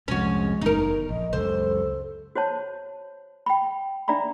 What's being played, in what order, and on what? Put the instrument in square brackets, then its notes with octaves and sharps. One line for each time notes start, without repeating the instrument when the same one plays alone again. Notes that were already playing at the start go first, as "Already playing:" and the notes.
[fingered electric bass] C2 F2 [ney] G#3 [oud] C#4 F#4
[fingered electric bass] F#1 E2 [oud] D#4 A#4
[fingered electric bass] A#1 [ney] D#5
[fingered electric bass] C#2 F#2 [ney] A4 [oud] C5
[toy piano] F#4 C5 C#5 A5
G5 B5
D4 D5 E5 A#5 B5